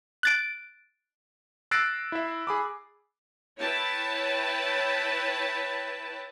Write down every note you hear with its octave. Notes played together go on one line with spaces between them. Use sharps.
F#6 A6 D7
E6 F#6 A6 A#6 C7 D7
E4 E5
G#4 B5 D6
E4 B4 C#5 G5 A5